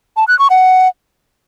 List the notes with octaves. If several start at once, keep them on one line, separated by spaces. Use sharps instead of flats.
A5
F#6
C#6
F#5